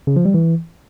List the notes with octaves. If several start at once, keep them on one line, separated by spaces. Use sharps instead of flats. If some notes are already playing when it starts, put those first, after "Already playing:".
C#3
F3
G3
E3